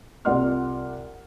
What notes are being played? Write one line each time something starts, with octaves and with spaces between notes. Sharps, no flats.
C2 F4 D5 F#5 C6 F6